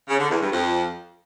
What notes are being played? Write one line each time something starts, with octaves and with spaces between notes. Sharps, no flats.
C#3
D3
E2
G2
F2